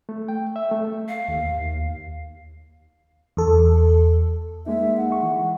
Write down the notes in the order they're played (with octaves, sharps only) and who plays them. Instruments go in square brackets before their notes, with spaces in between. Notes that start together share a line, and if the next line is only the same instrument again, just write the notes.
[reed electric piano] A3
G5
E5
A3
[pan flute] F5
[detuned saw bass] D#2
D#2
[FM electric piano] E2 A4
[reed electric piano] G#3 A#3 D#4 [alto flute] E5
[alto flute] F#5
[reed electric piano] G#3 C#6
E3